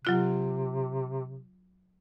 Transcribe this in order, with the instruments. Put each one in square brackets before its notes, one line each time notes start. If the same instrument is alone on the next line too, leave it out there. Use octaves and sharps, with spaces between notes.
[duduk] C3 [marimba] F#3 F4 F#6